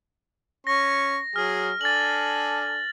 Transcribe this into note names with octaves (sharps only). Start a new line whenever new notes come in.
C#4 C#6 A#6
F#3 G#4 F6
D4 A4 G#5 A6 F#7